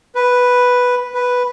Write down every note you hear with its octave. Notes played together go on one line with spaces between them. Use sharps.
B4
B4